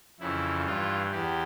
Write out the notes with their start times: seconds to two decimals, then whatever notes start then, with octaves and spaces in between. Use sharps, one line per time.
0.20 F2 C#3 E3 E4
0.65 G2 E3 F4
1.11 E2 E3 G4